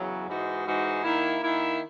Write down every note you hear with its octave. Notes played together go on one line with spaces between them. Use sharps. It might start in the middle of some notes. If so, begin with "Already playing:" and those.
Already playing: E2 C#3 F#3
G#2 E3 G#3 D#4 F#4
G#2 E3 G#3 D#4 F#4
D#3 A#3 E4
D#3 A#3 E4